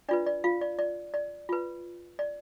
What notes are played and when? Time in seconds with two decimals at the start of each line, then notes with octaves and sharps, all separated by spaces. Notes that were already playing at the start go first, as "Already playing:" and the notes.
0.08 D4 F4 B4 D5
0.27 D5
0.44 F4 F5
0.61 D5
0.79 D5
1.14 D5
1.49 F4 B4
2.19 D5